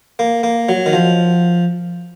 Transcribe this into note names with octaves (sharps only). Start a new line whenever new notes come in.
A#3
A#3
F#3
D#3
F3